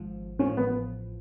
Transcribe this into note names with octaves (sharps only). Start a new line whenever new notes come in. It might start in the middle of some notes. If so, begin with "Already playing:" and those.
Already playing: G#1 G#2 F3
A1 A2 F3 C#4
B3